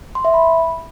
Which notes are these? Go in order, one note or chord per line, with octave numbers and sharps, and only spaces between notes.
C6
E5
B5